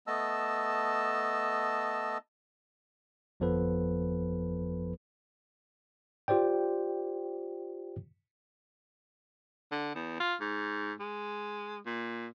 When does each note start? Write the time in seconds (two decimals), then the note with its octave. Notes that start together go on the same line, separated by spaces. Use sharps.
0.07 A3 B3 D#5 A5 E6
3.40 G1 F2 F3 B3 A4 B4
6.28 F4 G4 C5 D5 G5
9.72 D3
9.95 E2
10.20 F4
10.41 G#2
11.00 G#3
11.86 A#2